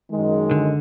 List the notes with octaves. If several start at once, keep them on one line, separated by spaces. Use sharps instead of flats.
F#2 D#3 G#3
D3